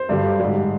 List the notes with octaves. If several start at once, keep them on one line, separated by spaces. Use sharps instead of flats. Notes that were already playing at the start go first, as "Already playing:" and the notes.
Already playing: C5
G2 D3 G3
G#2 G3